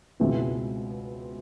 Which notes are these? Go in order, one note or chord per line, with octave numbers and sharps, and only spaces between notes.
C#2 B2 G#3 C4 E4